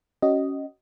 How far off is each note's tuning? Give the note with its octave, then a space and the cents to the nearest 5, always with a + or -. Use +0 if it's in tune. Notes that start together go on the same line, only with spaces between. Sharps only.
C#4 +0 F#4 +30 D#5 +0